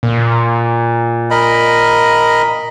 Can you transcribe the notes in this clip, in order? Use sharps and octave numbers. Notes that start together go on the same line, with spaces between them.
A#2
A#4 D#5 B5